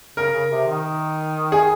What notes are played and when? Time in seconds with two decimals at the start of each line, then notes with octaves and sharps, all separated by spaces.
0.17 C#3 A#4
0.33 C#3
0.51 C3
0.67 D#3
1.52 G#4